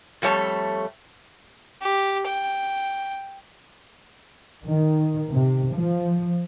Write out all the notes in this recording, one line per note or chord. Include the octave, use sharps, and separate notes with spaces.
F2 G3 A3 C#5 A5
G4
G5
D#3
C3
F3